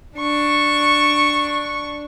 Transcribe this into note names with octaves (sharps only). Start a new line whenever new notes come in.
D4 C#6